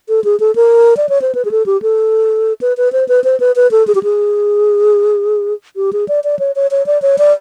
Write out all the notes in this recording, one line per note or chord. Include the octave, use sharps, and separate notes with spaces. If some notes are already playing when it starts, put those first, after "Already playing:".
A4
G#4
A4
A#4
D5
C#5
C5
B4
G#4
A4
G4
A4
B4
B4
C5
B4
C5
B4
B4
A4
G#4
G4
G#4
G4
G#4
D5
D5
C#5
C#5
C#5
D5
C#5
D5